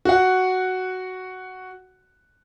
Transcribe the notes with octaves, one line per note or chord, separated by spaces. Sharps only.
F#4 F#5